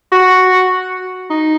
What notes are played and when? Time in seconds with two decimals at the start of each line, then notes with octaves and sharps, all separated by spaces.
0.12 F#4
1.30 D#4